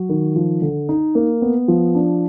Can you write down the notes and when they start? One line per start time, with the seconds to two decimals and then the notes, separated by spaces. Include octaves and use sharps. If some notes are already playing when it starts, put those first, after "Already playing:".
Already playing: F#3
0.09 D#3
0.36 F3
0.62 D3
0.89 D#4
1.15 A#3
1.42 B3
1.68 F3
1.95 D4